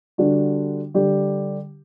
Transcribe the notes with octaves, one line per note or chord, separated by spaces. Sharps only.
D3 G3 D4 F#4
D3 G3 D4 G4